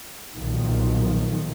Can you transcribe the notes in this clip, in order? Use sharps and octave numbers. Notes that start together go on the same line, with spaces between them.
B1 A#2 D#3 F3